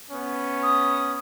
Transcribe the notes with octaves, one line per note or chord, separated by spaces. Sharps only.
B3 C#4
D#6